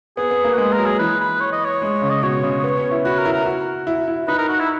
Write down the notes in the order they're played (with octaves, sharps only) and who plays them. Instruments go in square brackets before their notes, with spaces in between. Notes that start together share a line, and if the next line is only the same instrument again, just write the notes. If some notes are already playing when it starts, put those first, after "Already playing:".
[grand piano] B3 [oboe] G#4
[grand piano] B3
A#3
[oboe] F#4
[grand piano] G#3 [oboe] G#4
[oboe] A#4
[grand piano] F#3
[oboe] G#4
[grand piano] E3 [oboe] B4
[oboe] B4
C#5
D#5
C#5
[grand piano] G#3
C#3
[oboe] D#5
[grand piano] B2 [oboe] C#5
[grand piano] C#3
B3
C#4
E4
[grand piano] F#4 [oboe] B4
[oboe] A#4
[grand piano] E4
[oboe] A#4
[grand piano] F#4
E4
E4
[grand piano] D#4 [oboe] B4
[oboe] A#4
F#4
E4